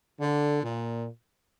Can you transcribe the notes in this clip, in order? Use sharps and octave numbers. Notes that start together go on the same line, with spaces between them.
D3
A#2